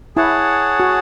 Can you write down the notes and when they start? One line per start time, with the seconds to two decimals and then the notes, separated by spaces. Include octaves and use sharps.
0.16 E4 G#4 C#5 F#5 A5
0.80 F#4